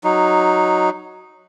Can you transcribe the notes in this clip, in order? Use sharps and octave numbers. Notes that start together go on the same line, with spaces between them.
F#3 D#4